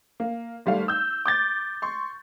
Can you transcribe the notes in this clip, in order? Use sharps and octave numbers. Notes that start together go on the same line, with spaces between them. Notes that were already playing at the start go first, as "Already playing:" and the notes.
A#3
G#1 G3 A3 F5
E6 G6
D6 G6 A6
C6 C#6